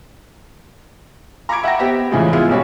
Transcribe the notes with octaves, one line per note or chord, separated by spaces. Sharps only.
A#5 B5 C#6 D6 G#6 D7
E5 F#5 G5 A#6
B3 G4 C5 E5
A2 C#3 E3 F3 G#3
G#3 B3 E4 F4 G#4
B1 G3 C#4 F#4